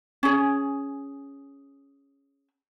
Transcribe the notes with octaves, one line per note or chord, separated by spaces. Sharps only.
C#4 G#4